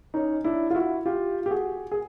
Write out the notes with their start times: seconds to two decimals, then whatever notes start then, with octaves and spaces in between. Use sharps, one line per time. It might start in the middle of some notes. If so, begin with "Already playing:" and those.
0.14 C#4 D#4
0.44 D4 E4
0.70 F4
0.74 E4 F#4
1.06 F4 G4
1.46 G4
1.51 F#4 G#4
1.92 G#4